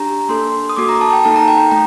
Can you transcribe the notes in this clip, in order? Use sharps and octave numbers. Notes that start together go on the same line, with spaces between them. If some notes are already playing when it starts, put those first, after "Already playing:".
Already playing: D4 G4 A#5
A#3 D4 A4 C6
D#6
A#3 F#4 A4 D6
A#5
A5
G5
A#3 D#4 A4 A5
A#5
G5
G5
A3 A#5